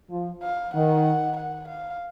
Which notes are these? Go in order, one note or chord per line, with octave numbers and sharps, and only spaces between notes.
F3
F5
D#3 F#5
F#5
F5